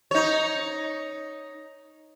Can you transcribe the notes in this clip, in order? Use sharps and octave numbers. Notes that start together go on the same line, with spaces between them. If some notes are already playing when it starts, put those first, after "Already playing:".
D#4 C#5